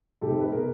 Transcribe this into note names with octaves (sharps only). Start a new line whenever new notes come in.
F1 F2 C3 D#3 G4 A4
B4
B2 G#4 A#4